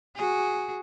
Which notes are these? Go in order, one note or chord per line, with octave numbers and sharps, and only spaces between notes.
F#4 G#4